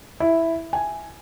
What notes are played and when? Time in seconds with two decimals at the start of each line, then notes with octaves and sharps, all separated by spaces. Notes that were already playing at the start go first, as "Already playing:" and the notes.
0.20 E4
0.73 G#5